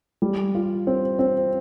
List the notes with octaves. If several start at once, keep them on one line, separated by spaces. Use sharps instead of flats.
G3
F4
C4
C4